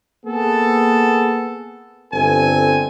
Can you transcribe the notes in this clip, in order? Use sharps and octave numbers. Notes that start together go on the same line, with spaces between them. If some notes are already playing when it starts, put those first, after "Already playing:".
A#3 B3 G#4 A4
G1 C4 A4 G#5